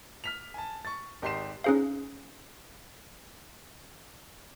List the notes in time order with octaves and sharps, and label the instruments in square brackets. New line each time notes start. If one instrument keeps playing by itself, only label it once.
[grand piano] F6 B6 F7
G#5 A5
C#6 A6
G#1 G4 D#5 C6 C7 E7
[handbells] C#4 D#4 G#4 C5 F5